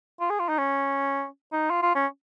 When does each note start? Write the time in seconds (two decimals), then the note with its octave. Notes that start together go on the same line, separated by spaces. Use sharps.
0.20 F4
0.30 G#4
0.40 F4
0.49 D#4
0.59 C#4
1.52 D#4
1.70 F4
1.82 F4
1.95 C#4